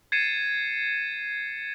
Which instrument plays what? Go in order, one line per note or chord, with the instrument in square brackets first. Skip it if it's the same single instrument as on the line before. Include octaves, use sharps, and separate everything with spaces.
[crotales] G#6 A6 C7 C#7 D#7 E7